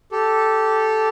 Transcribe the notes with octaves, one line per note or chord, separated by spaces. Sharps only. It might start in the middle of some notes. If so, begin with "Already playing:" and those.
G4 A4